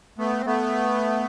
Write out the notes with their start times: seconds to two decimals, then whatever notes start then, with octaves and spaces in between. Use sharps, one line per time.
0.18 A3 B3
0.40 C4
0.46 A3 B3